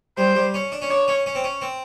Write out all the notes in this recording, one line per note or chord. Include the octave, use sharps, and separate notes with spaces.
G3 C5
G3
C#4
D4
C#4
D4 C#5
C#4
C#4
C4
C#4
C4